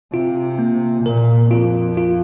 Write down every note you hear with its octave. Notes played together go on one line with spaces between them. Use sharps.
C3 F4
A#3
A#2 A#4
F2 F4
F4